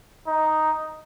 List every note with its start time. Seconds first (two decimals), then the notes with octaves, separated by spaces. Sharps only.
0.27 D#4